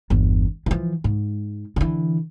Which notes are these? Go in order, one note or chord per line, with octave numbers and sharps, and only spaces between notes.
G1 E2
E3 F3
G#2
D3 E3